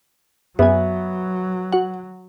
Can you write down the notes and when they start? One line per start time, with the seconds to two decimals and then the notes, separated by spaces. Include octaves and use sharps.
0.59 F#2 F#3 B3 E5 G#5
1.73 F#4 F#5